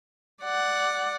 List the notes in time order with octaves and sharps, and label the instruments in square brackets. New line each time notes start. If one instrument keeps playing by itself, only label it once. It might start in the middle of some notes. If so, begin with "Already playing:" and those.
[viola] D5 F#5